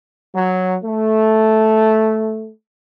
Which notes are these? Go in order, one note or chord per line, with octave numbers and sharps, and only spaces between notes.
F#3
A3